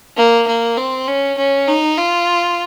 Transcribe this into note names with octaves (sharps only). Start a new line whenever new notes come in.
A#3
A#3
C4
C#4
C#4
D#4
F4